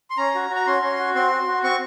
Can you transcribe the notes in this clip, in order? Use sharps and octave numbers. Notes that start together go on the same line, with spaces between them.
C6
C#4 A#5
F#4
F#4
A#5
C#4 C6
C#4
F#4
C4 C6
F#4
F#4
C4 C#6